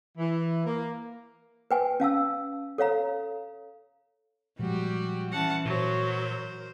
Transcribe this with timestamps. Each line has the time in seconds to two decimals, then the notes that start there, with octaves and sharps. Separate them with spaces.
0.18 E3
0.66 A#3
1.71 B4 G5 G#5
2.00 C#4 F5 A5 E6
2.78 A4 C#5 F5 A#5
4.59 A#2 F3 G3 G#3 F#4 G4
5.32 E3 C#4 F#5 A5
5.65 A#2 F#3 A#4 C5